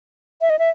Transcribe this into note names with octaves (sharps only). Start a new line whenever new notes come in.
E5
D#5
E5